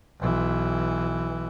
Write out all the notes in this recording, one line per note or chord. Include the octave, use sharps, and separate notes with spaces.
B1 E3